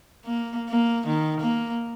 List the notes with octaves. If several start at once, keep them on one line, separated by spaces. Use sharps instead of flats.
A#3
A#3
D#3
A#3